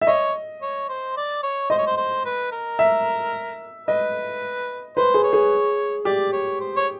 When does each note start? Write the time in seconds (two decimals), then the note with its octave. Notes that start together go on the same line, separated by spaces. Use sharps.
0.01 E5
0.07 C#5 D#5
0.62 C#5
0.89 C5
1.17 D5
1.43 C#5
1.70 C5 D#5
1.78 C#5
1.86 C5
1.97 C5
2.25 B4
2.52 A#4
2.79 E5
3.88 B4 D#5
4.97 B4 C5
5.14 G#4
5.24 C#5
5.33 G#4
6.05 G4 D5
6.32 C#5
6.60 C5
6.76 C#5